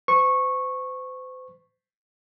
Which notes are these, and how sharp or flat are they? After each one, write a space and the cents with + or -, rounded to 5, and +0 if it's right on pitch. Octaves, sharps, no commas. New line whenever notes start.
C5 -40 C#6 -15